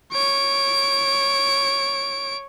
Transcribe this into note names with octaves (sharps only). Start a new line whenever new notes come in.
C#5 D7